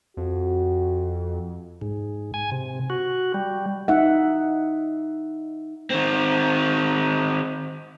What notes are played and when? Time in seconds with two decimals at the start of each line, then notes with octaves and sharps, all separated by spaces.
0.17 F2 F#4
1.81 G#2
2.34 G#5
2.52 C3
2.90 F#4
3.34 G3
3.88 D#4 E5 F#5
5.90 D#3 C4